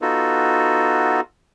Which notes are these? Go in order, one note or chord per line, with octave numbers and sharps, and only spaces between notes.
B3 D#4 F4 F#4 A4